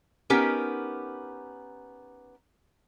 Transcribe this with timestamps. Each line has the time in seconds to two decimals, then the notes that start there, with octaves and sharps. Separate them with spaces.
0.30 B3 C#4 D#4 G4 A#4